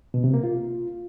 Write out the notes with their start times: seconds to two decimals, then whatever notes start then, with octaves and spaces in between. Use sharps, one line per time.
0.14 B2
0.24 C3
0.34 A#3
0.44 F4